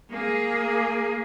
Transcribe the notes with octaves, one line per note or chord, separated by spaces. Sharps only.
A#3 G#4